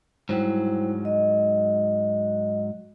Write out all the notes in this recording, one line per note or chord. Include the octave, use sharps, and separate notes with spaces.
G#2 F#3 G3 E4 C5
D#5